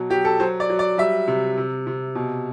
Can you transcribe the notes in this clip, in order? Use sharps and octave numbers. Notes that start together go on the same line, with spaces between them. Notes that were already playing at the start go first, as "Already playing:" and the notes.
Already playing: B2 F#3
F#3 G4
A4
F#3 C5
D5
F#3
D5
G3 E5
C3
C3
C3
B2